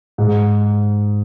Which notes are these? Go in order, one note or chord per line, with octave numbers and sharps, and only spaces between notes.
G#2